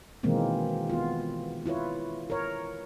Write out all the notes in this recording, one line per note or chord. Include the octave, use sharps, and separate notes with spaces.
B2 D#3 E3 G#3 A#3 C4
B3 F4
E4 F4 B4 C#5
A#4 C#5